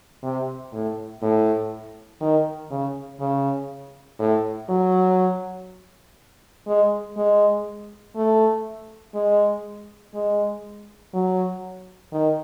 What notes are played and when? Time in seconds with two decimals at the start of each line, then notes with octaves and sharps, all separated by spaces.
0.23 C3
0.73 A2
1.22 A2
2.21 D#3
2.71 C#3
3.20 C#3
4.19 A2
4.69 F#3
6.67 G#3
7.17 G#3
8.16 A3
9.15 G#3
10.15 G#3
11.13 F#3
12.13 D#3